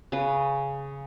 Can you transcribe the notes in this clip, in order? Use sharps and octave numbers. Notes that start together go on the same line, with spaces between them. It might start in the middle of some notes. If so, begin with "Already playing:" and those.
C#3 B4